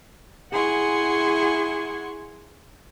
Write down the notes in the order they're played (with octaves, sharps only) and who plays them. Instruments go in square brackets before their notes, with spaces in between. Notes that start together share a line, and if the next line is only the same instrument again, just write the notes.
[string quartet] E4 G#4 F#5 G#5 C6 C#6